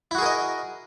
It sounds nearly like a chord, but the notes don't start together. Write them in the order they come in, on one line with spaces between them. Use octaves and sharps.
E4 F#4 G#4 A#4 D#5